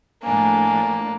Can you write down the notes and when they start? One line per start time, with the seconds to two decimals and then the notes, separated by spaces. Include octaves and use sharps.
0.24 A2 F3 A#3 D4 G#5